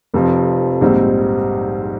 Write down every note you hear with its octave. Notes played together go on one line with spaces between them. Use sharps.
F1 F2 C3 F3 C4
A#1 G#2 G3 C4 D#4